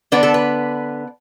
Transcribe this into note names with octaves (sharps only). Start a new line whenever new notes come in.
D3 B3 D4 B4
A4
B4